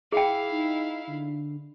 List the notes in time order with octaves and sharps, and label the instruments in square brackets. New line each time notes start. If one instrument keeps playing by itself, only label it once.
[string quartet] E4 F5 [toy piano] G#4 G5
[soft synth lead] D#4
D3